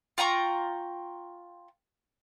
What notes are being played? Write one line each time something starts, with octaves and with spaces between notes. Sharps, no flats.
F4 G5 A#5 C#6